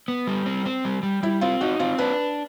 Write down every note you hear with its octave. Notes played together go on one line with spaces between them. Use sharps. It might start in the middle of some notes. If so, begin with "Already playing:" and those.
B3
G3
C4
C4
G3
G3
G3 E4
C4 F4
D#4 F#4
C4 F4
D4 B4